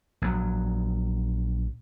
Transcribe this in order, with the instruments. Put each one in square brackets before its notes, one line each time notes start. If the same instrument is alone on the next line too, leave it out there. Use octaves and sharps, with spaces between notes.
[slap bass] A#1 F#3